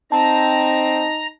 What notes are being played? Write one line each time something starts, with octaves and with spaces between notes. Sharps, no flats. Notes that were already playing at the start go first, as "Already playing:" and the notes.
C4 D#4 A5 A#5